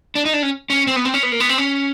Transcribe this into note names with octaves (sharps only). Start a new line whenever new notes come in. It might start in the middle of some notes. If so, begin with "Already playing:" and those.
D4
D#4
D4
C#4
C#4
C4
B3
C4
C#4
B3
A#3
B3
C4
C#4